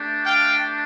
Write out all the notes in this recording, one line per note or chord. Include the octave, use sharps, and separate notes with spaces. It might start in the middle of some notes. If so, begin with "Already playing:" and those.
Already playing: A3 D4 G4
F5 G5